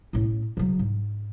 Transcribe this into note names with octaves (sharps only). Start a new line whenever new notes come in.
A2 C#4
C#3 F#3
G#2